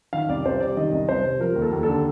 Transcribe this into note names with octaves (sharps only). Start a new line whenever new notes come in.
D#3 F5
C2 D5
C2 C5
C3 D5
D#3 D#5
C2
C2 C5
C3
F3 A#4
D#2
A4
D#2
A4
D3